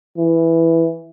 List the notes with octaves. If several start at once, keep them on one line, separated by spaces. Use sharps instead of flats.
E3